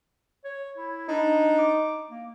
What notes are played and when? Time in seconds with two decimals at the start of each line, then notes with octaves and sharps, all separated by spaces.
0.45 C#5
0.77 E4
1.08 D4 D#4
1.58 D6
2.10 A#3